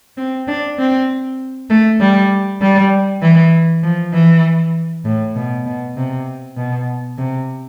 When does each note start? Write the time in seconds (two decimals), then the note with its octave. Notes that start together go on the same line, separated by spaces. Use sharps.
0.17 C4
0.47 D4
0.78 C4
1.70 A3
2.01 G3
2.61 G3
3.22 E3
3.83 F3
4.13 E3
5.05 A2
5.36 B2
5.66 B2
5.96 C3
6.57 B2
7.18 C3